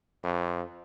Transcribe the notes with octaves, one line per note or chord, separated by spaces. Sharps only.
F2